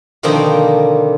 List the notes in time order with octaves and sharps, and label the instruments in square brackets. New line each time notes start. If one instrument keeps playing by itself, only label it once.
[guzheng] B2 D3 D#3 F3 A#3 C4